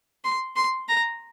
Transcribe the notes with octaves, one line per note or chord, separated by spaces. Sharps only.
C6
C6
A#5